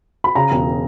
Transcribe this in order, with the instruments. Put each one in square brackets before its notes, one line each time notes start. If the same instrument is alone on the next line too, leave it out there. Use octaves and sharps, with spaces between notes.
[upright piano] B5
C#3 A#5
E1